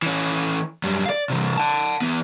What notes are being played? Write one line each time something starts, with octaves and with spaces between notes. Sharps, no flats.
E3 C#4
F#2 G3
D5 F5
C3 E3
F#5 A5
E3 B3